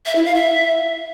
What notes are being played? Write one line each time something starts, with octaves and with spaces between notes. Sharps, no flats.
E5
E4
F5
E5